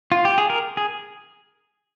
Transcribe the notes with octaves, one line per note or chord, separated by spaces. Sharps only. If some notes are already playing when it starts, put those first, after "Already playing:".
F4
G4
G#4
A#4
G#4